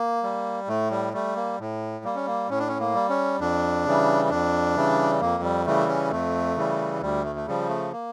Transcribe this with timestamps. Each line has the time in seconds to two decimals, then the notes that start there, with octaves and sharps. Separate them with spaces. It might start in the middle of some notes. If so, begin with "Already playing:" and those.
Already playing: A#3
0.23 G3
0.68 A2 A3
0.91 G3
1.14 G3 A3
1.36 A#3
1.59 A2
2.04 G3 A#3
2.16 C#4
2.27 A#3
2.49 A2 C#4
2.59 D4
2.68 C#4
2.80 A#3
2.94 G3
3.10 C#4
3.40 F2 D4
3.85 C#3 E3 G3
4.30 F2 D4
4.76 C#3 E3 G3
5.21 F2 A#3
5.43 G3
5.66 C#3 E3 G3 A3
5.89 C#4
6.11 F2 A3
6.56 C#3 E3 G3
7.01 D2 G3
7.25 A3
7.36 A3
7.47 C#3 F3 G3
7.69 A3
7.92 A#3